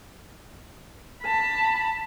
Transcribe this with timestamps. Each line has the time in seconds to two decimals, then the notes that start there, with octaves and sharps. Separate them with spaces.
1.22 A5 B5